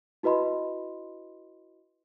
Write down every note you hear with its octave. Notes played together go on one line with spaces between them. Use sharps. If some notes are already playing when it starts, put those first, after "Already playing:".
E4 F#4 B4 D#5 B5 C6